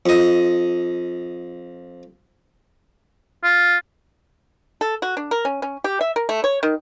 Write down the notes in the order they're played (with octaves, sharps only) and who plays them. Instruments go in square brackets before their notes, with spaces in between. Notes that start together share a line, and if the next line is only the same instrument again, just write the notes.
[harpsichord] F2 D#5
[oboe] F4
[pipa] A4
F#4
D4
A#4
C#4
C#4
G4
E5
A#4
A3
C#5
D#3